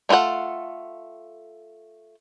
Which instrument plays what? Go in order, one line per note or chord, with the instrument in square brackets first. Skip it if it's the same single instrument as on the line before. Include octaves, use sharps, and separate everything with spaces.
[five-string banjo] A3 D#4 F4 A4 F#5